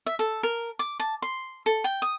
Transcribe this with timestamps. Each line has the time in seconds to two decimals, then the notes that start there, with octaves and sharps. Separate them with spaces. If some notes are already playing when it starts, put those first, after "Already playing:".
0.06 E5
0.19 A4
0.43 A#4
0.79 D6
1.00 A5
1.22 C6
1.66 A4
1.84 G5
2.02 D#6